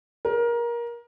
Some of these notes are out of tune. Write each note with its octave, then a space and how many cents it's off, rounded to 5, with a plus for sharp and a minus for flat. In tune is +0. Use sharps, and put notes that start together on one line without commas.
A#4 +20